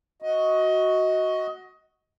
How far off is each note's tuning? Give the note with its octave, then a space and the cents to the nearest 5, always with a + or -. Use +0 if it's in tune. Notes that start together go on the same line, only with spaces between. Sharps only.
F#4 +0 D#5 +20